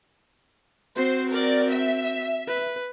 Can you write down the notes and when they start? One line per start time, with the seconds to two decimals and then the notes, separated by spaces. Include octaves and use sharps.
0.96 C4 F#4 C5
1.31 A#4 D5
1.70 E5
2.47 B4